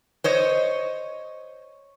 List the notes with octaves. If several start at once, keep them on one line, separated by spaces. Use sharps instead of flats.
C5 C#5 D#5